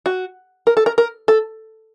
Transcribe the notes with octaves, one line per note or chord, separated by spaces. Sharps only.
F#4
A#4
A4
A#4
A#4
A4